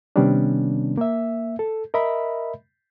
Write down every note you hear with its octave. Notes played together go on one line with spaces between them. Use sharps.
C3 D#3 G3 B3 C#4 D4
A#3 E5
A4
A#4 D#5 E5 B5